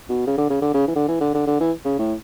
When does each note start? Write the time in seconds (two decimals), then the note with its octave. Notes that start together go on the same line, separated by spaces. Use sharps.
0.09 B2
0.27 C#3
0.38 D3
0.50 C#3
0.62 D3
0.74 C#3
0.87 E3
0.96 D3
1.09 E3
1.21 D3
1.34 D3
1.47 D3
1.60 E3
1.85 C#3
1.98 A2